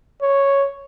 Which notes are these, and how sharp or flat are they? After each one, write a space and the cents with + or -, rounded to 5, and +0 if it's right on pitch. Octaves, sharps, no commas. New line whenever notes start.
C#5 +0